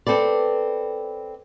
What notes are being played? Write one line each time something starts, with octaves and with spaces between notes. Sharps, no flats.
C4 A4 B4 D5